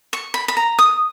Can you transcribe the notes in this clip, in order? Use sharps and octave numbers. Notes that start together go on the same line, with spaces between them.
C#6
B5
B5
A#5
D#6